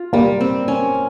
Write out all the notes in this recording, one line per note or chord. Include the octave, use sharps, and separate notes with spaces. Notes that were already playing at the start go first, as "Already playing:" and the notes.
Already playing: F4
G3 A#3
C4
C#4